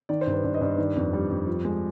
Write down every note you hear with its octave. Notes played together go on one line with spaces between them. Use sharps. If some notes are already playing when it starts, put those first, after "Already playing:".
D#3 D5
C5
G2
B4
G2 D5
D#5
G2 D5
D#3 D5
F2
G3
F2
F3
G#3